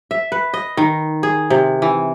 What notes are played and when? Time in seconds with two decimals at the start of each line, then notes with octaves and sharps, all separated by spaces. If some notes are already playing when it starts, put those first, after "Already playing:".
0.11 E5
0.32 B4
0.54 D#5
0.77 D#3
1.23 G#4
1.50 C3
1.82 E3